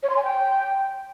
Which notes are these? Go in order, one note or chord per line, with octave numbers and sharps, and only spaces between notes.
C#5
C6
G#5
G5